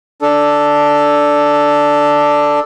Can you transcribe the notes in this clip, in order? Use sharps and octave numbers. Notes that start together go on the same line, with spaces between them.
D4 A4